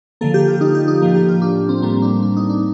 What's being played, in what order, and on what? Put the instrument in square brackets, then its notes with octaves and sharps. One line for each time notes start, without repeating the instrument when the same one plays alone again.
[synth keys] D3 F3 A#3 A4
G4
F4
D#4
G4
D#4
A2 F3 A#3
G4
F4
D4
C4
A2 G3 A#3 C4
D4
D4
D#4
D4